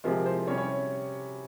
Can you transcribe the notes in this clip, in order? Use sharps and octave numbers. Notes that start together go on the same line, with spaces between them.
C3 F3 G#3 A#4
C5
C3 G3 C#4 C#5
C#5